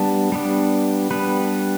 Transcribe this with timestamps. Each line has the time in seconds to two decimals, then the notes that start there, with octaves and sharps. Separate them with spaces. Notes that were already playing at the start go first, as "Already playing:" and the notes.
Already playing: G3 B3 D4 A5
0.32 G3 B3 D4
1.11 G3 B3 D4 B4